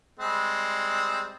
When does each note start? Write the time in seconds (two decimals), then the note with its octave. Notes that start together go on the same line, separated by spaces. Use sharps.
0.19 G3 G#3 C4